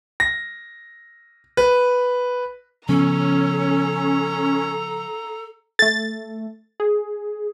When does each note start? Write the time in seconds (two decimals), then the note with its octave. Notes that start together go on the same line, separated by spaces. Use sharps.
0.20 A#6
1.57 B4
2.89 C#3 F3 B3 C#4 A4 A#5
5.79 A3 A4 A6
6.80 G#4